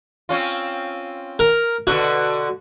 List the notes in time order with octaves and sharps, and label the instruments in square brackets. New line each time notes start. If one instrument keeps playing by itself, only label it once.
[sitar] C4 C#4 F4
[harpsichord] A#4
[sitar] B2 D3 [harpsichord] F#4